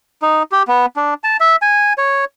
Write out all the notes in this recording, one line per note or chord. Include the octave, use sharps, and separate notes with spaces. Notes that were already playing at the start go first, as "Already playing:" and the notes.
D#4
G4
B3
D4
A5
E5
G#5
C#5